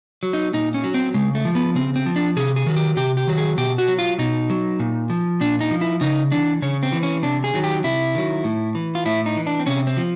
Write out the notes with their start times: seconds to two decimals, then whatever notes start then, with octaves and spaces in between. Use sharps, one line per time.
0.23 F#3
0.33 D#4
0.54 A#2 D#4
0.74 C#4
0.84 F#3
0.94 C4
1.14 C#3 G#3
1.35 A3
1.45 F3
1.55 B3
1.75 C#3 C4
1.96 C4
2.06 F3
2.16 D4
2.36 C3 G#4
2.56 G#4
2.67 D#3 F#3
2.76 G4
2.97 C3 G4
3.17 G4
3.28 D#3 F#3
3.38 G#4
3.58 B2 G4
3.78 F#4
3.88 F#3
3.99 F4
4.19 B2 D#4
4.50 F#3
4.79 A#2
5.10 F3
5.41 A#2 D4
5.61 D#4
5.71 F3
5.81 E4
6.01 C#3 D#4
6.32 E3 D4
6.62 C#3 C#4
6.83 C4
6.92 E3
7.03 C#4
7.23 C3 D4
7.44 G#4
7.54 D#3 F#3
7.64 G4
7.84 C3 E4
8.15 D#3 F#3
8.44 A2
8.75 E3
8.95 F4
9.06 A2 E4
9.26 D#4
9.36 E3
9.47 D4
9.59 C4
9.66 C3 C#4
9.87 C4
9.97 F3